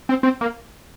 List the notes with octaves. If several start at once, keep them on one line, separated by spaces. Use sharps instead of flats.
C4
C4
A#3